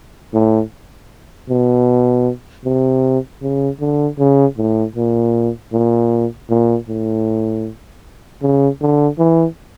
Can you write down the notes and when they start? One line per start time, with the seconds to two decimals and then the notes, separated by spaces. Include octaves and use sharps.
0.34 A2
1.50 B2
2.65 C3
3.42 C#3
3.80 D3
4.19 C#3
4.57 A2
4.96 A#2
5.73 A#2
6.50 A#2
6.89 A2
8.42 C#3
8.81 D3
9.19 E3